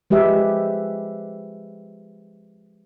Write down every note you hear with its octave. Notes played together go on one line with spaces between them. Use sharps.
F3 G#3 G4 B4 E5